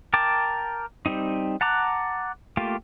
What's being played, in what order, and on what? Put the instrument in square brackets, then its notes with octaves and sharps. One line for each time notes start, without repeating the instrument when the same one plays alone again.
[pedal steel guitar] A#4 G5 A5 D6
G3 C4 D#4
F#5 A5 A#5 D6 F#6
A3 A#3 F4 G4